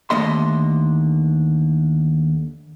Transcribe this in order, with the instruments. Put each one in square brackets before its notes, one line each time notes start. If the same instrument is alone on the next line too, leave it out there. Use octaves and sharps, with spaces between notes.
[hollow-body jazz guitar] D#2 D3 A3 D#5 E5 C6